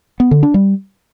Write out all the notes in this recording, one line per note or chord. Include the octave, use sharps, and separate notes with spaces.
B3
D3
D4
G3